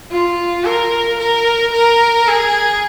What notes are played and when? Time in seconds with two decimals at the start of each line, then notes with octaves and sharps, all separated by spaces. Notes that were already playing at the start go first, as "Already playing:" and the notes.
0.11 F4
0.65 A#4
1.19 A#4
1.73 A#4
2.27 G#4